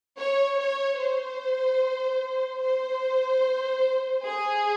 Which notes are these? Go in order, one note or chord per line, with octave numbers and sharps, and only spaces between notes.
C#5
C#5
C5
C5
G#4